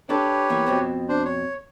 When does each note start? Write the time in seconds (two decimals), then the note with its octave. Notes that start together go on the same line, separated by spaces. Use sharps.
0.09 D4 G4 A4 B4 C#5
0.50 E3 A#3 B3
0.66 F2 B2 C4
1.08 D4 C5
1.25 C#5